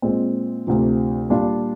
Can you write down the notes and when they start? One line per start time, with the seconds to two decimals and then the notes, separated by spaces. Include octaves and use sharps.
0.02 A#2 G#3 C4
0.67 D2 C3 F3
1.30 A#2 G3 D4 F4